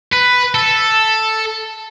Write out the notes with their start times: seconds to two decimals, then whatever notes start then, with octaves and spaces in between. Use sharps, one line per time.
0.13 B4
0.55 A4